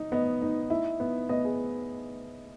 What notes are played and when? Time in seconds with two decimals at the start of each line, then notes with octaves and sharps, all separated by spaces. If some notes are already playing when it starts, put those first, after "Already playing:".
Already playing: D#4
0.12 B3 D#5
0.41 D#4
0.70 E4
1.00 B3
1.29 B3 D#5
1.44 G#4